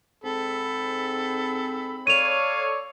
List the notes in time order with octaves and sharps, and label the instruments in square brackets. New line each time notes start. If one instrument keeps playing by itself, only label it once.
[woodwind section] G#2 C4 B5 [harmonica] A4
[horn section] A4 C#5 D5 [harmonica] F5 [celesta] D#7 F7